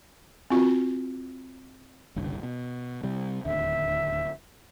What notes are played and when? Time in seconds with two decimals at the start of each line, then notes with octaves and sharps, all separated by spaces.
0.50 C4 F4 F#4
2.16 F#1 C2 D3
2.43 B2
3.03 C3 G3
3.45 D1 D#2 D3 E5